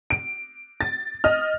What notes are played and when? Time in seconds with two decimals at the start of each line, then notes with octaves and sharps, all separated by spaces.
0.10 D7
0.81 A6
1.24 D#5 F6